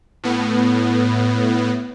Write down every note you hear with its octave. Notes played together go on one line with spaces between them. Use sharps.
A2 B3